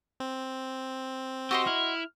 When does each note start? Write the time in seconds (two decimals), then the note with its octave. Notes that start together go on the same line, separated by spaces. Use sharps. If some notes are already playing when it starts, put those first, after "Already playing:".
0.20 C4
1.51 F#4 G4 D#5 C6 E6
1.67 E4 F6